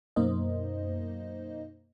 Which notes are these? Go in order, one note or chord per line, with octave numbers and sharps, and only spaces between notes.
F#2 B2 A#3 D#4 C5 D#5